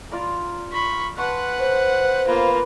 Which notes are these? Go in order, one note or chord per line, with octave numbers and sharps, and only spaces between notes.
F4 D5 A#5
B5 C#6
B4 F#5 A5 C6 C#6
C5 C#5
A#3 B3 F4